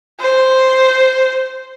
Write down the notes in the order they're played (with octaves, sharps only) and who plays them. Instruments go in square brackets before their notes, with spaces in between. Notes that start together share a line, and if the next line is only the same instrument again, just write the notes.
[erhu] C5